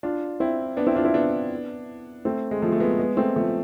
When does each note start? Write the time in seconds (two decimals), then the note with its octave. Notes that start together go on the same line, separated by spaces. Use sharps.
0.03 D4 F4
0.40 C4 E4
0.77 B3 D4
0.87 C4 E4
0.95 D4 F4
1.05 C4 E4
1.14 B3 D4
2.25 A3 C4
2.51 G#3
2.62 F3 A3
2.72 A3
2.80 G#3 B3
2.99 G#3 B3
3.17 A3 C4
3.36 F3 A3